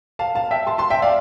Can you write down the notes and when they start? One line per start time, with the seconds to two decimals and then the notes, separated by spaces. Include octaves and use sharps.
0.19 F5 A5
0.35 F5 A5
0.51 E5 G5
0.67 A5 C6
0.78 A5 C6
0.90 E5 G5
1.02 D5 F5